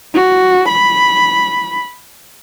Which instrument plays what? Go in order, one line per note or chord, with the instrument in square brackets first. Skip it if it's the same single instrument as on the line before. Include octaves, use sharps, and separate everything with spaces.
[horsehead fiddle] F#4
B5